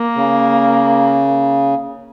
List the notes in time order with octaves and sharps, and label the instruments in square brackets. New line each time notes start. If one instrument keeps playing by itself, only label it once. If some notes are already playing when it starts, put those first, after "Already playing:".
Already playing: [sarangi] A#3
[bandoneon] C#3